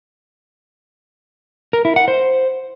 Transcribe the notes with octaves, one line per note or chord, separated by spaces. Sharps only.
A#4
E4
F#5
C5